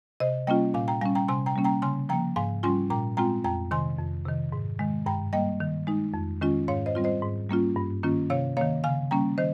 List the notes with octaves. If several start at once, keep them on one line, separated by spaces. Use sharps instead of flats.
C3 C5 D#5
G3 A#3 C#4 F4 D#5 G5
A#2 F5 G#5
G5 A#5
G3 C#4 F5 G#5
G5 A#5
C3 G#5 C6
G5 A#5
G3 A#3 C#4
G5 A#5
C#3 G#5 C6
F3 A#3 G5 A#5
G#2 F5 G#5
G3 C#4 F4 G#5 C6
A#2 G5 A#5
G#3 C4 F4 G5 A#5
F2 G5 A#5
C3 D#3 G#5 C6
F2
C3 D#3
G#2
D#3 G#3
G2 G5 A#5
G3 A#3 D#5 G5
D#3
G#3 D#4
F2
D#3 G#3 C#4 F4
G#2 C#5 F5
C5 D#5
G3 C4 F4
C5 D#5
G#2
G3 A#3 C#4 F4
G2
D#3 A#3 C#4 F4
C3 C#5 F5
D#3 A#3 C#5 F5
C#3 F5 G#5
G3 A#3 C#4 G5 A#5
D#3 C5 D#5